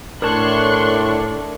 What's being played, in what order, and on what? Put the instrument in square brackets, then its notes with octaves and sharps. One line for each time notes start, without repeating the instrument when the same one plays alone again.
[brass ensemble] A2 [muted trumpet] D4 [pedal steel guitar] A#4 C#5 A5 [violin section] C6 C#6 F#6